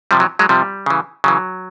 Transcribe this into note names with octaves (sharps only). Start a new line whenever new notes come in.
C3 F3 G3
F#3
F#3 G#3
C3 F3 G3
C#3 E3
C#3 E3 F#3